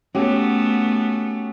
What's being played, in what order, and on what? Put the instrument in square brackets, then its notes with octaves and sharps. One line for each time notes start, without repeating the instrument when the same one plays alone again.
[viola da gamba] A3 B3 [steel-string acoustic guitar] C#4 F#4 G4